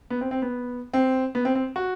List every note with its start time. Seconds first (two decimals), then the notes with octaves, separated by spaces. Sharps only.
0.10 B3
0.21 C4
0.31 C4
0.42 B3
0.94 C4
1.35 B3
1.45 C4
1.55 C4
1.76 F#4